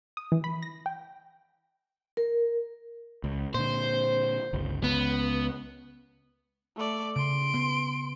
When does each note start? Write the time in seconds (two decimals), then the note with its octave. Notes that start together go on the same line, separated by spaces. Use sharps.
0.17 D#6
0.32 E3
0.44 B5
0.62 A#6
0.86 G5
2.17 A#4
3.24 C#2
3.55 A#2 D3 C5
4.53 G1 C#2
4.84 C#2 B3
6.77 A3 D5
7.16 C#3 C6 D7
7.54 B3